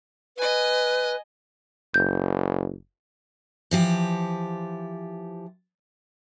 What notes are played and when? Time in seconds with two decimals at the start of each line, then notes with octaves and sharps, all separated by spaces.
0.37 B4 D#5 G#5
1.94 F#1 G6
3.71 E3 F3 G4